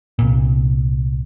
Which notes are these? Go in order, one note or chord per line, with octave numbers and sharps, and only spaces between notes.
C2 A#2